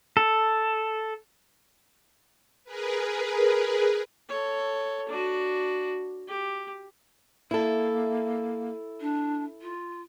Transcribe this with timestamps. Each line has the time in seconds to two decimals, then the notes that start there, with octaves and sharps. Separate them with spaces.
0.17 A4
2.64 G#4 A#4 B4
4.28 A4 C#5
5.08 D4 F#4
6.28 G4
7.51 A#3 E4 A4
9.00 D4
9.62 F4